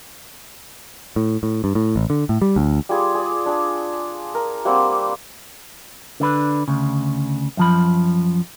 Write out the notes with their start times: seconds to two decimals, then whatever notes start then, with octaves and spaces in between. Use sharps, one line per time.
1.16 A2
1.43 A2
1.64 G2
1.75 A2
1.96 A1
2.10 D3
2.29 A2
2.42 G3
2.56 D2
2.89 G3 F4 G#4
3.15 G#4 D5
3.46 D4 G#4
4.35 A#4
4.65 G3 A#3 C4 F#5
6.20 D3 D4 B4
6.68 D2 C#3
7.57 F#2 F3 B5